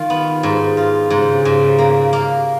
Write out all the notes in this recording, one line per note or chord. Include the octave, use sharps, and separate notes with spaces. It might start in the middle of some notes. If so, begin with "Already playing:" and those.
Already playing: D#3 F4
B3
G#2
F4
G#2 C#3
G#2
A#3
A#3